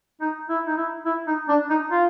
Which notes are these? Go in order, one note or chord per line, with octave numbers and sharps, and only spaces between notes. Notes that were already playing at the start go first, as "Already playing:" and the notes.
D#4
E4
D#4
E4
E4
D#4
D4
D#4
F4